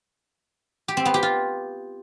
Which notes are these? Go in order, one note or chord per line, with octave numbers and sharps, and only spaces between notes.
G4
C4
B3
G4
F4